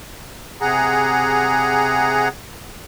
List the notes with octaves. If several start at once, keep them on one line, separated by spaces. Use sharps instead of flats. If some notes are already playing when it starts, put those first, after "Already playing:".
C3 G#4 F#5 A#5